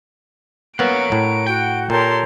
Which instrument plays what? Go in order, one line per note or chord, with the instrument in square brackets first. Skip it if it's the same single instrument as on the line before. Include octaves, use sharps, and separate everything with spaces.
[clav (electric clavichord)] A#3 B3 [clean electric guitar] A#4 C#5 F#5 [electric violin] D7
[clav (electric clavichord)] A2
[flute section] F#4 F#5 [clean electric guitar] G5
[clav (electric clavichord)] A#2 [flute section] G4 A#4 C#5 [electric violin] A4 C6